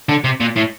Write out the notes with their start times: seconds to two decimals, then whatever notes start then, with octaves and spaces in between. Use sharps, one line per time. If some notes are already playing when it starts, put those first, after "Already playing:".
0.09 D3
0.24 C3
0.40 A#2
0.56 A2